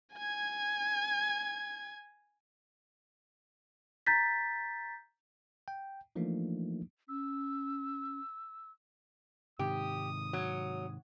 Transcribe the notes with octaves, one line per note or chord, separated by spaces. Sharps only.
G#5 G#6
A#5 G6 A6 B6
G5
E3 F3 A3 A#3 D4 D#4
C#4 E6
G#2 C3 D#3 G4 D#6
F#3